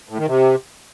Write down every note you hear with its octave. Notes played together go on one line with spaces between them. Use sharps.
A2
D#3
C3